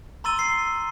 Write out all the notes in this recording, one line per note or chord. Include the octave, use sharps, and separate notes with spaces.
A#5 C6 E6 A6 D#7 G7
C7